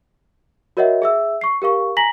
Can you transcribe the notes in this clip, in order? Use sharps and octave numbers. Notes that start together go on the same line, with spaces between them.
F#4 A#4 C#5 D#5 E5 F#5
G#4 E5 E6
C#6 C7
G4 A#4 F5 C#6
G#5 A#5 A#6 B6 F#7